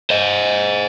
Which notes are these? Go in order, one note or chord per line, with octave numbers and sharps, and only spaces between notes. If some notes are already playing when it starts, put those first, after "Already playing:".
C5 D#5